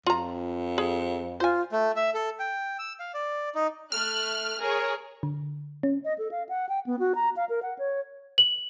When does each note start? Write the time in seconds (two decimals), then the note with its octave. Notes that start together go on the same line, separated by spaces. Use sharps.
0.07 F2 F4 A#5
0.78 G#4
1.40 F4 C5 G#5
1.72 A3
1.96 E5
2.14 A4
2.39 G5
2.79 E6
3.00 F5
3.14 D5
3.55 D#4
3.92 A3 F6 F#6
4.61 G#4 A#4 C#5
5.23 D3
5.83 C#4
6.05 D#5
6.18 A4
6.31 F5
6.49 F#5
6.69 G5
6.87 B3
6.99 F#4
7.15 A#5
7.36 F5
7.49 A#4
7.63 F#5
7.79 C#5
8.38 F#7